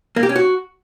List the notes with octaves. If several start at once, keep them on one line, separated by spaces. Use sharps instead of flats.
A#3
G4
C#4
F#4